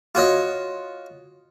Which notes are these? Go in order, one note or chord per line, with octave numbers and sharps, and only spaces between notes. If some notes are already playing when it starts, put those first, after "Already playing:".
F4 F#4 C#5 D#5